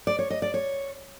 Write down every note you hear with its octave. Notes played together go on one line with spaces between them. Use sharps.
D5
C#5
D#5
D5
C#5